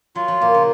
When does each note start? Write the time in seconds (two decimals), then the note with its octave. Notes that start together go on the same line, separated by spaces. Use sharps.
0.15 F#3 F4
0.28 F3
0.41 A#2 A#3
0.54 C#3